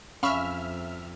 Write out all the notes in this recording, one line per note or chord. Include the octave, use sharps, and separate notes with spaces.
F2 C#4 E5 F5 B5 C#6 F6